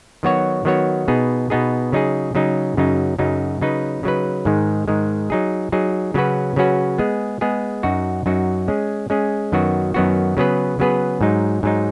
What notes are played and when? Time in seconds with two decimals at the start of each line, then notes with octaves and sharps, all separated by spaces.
0.23 D#3 F#3 B3 F#4 C#5
0.65 D#3 F#3 B3 F#4 C#5
1.08 B2 B3 D#4 G#4
1.50 B2 B3 D#4 G#4
1.92 C#3 F#3 D#4 G#4
2.35 C#3 F#3 D#4 G#4
2.77 F#2 C#3 F#3 D#4
3.19 F#2 C#3 F#3 D#4
3.61 C#3 F#3 D#4 B4
4.03 C#3 F#3 D#4 B4
4.45 G#2 D#3 G#3
4.88 G#2 D#3 G#3
5.30 F#3 D#4 G#4
5.72 F#3 D#4 G#4
6.14 C#3 F#3 C#4 F#4 B4
6.56 C#3 F#3 C#4 F#4 B4
6.98 G#3 B3 G#4
7.41 G#3 B3 G#4
7.83 F#2 F#3 D#4 F#4
8.26 F#2 F#3 D#4 F#4
8.68 G#3 C#4 G#4
9.10 G#3 C#4 G#4
9.52 F#2 D#3 F#3 B3 F#4
9.94 F#2 D#3 F#3 B3 F#4
10.37 C#3 F#3 B3 G#4 B4
10.79 C#3 F#3 B3 G#4 B4
11.21 G#2 F#3 D#4
11.63 G#2 F#3 D#4